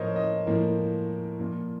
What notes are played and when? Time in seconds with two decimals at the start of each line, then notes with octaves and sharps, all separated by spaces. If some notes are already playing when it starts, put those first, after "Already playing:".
Already playing: A2 F3 A#3 A#4 C5 C#5 D#5
0.16 D#5
0.46 A2 F3 A#3
1.39 A#2 F3 A#3